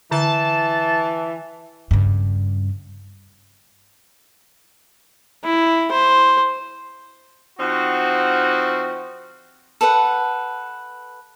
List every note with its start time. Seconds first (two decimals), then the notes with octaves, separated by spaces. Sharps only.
0.11 D3 E3 A5
1.91 G2 C#3
5.44 E4
5.92 C5
7.59 F3 C4 D#4 F#4
9.81 A4 B4 F#5